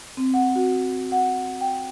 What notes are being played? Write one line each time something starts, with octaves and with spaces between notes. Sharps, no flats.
C4
F#5
F#4
F#5
G5